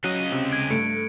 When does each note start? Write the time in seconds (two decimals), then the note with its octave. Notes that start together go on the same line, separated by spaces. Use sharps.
0.04 C#3 F#3 D#5 F#6
0.32 C3 C4
0.51 G#6 D7
0.70 G2 A3 C#7 D7